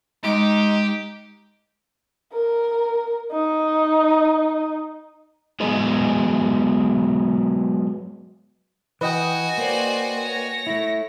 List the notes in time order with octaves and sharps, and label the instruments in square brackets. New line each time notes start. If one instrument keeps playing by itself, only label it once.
[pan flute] G#3 [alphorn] D#4 [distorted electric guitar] G4
[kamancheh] A#4
D#4
[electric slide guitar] F#3 G#3 B3 G#4 D#5 A#5
[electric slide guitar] E3 [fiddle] F#4 G#5 [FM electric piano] B4 D#5 G5
[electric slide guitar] A#3 [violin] C5 D5
[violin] C#5 A#6
[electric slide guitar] A3 E4